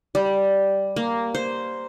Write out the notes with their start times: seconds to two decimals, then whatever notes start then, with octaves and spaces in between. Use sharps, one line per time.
0.15 G3
0.96 A#3
1.35 C5